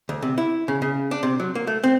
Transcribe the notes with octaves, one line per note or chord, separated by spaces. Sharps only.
D2
C3
E4
C#3
C#3
D4
C3
F#3
A#3
A3
C4